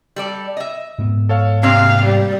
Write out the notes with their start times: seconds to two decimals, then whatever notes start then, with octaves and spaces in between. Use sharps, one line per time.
0.16 G3 A4 D5
0.57 D#5 E5
0.98 G#2 B3
1.29 A4 C#5 F5
1.63 C3 A#3 C4 D4 F5
2.04 G3